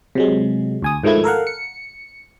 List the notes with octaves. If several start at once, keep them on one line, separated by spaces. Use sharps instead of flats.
C3 F#3 G#3
D2 G#5 D#6
G#2 D#3 F3 A3 E4 G#6
A4 A#4 F5 F#5
C#7